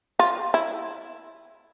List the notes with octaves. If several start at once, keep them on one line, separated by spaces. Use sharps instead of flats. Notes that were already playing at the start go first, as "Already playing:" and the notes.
F4
E4